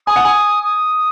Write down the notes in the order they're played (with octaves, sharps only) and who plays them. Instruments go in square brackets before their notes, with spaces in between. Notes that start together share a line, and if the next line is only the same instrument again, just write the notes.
[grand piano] G#5 [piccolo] D#6
[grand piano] F#5
G#5
[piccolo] D#6